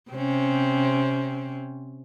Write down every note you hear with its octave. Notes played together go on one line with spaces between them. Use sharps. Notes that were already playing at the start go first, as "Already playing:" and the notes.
C3 C4 C#4